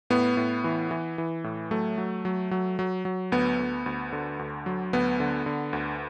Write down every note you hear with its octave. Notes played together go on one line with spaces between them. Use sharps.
A2 B3
A2
E3
E3
E3
A2
F#3 A3
F#3
F#3
F#3
F#3
F#3
D2 B3
D2
D2
D3
D2
F#3
D2 B3
D3
D3
D2